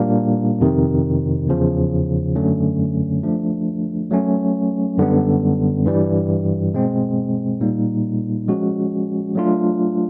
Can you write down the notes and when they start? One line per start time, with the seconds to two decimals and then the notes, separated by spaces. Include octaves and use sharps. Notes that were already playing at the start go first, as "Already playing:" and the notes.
Already playing: A#2 G3 A#3 D4
0.61 F2 C3 D#3
1.48 E2 C#3 F3
2.36 F#2 D3 F#3 A3 C#4
3.23 F3 A3 D4
4.11 F#3 A3 C#4
4.98 F#2 D3 G3 B3
5.86 G2 E3 G3
6.74 B2 G#3 C4
7.60 A#2 G3 A#3 D#4
8.48 F3 G#3 C#4 F#4
9.35 F#3 A3 D4 F4